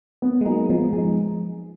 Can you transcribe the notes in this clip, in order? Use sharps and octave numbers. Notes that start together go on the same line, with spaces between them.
B3
G#3
F#3 A#3 D#4 G#4
F3 G#3 B3
F3 G#3 D#4 G#4